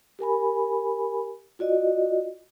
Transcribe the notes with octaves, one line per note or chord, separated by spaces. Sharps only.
G4 A#4 G#5 B5
F4 F#4 D5 D#5